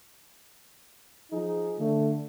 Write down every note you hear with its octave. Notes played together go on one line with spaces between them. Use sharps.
F3 D#4 G#4
D3 A3